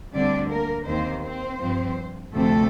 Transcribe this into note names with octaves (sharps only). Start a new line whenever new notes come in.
D2 D3 G3 C4 D4 D5
A#3 A#4
D#2 D#3 A#3 C4 C5
C4 C5
G2 F3 C4
D2 C3 F3 A3 C4 A4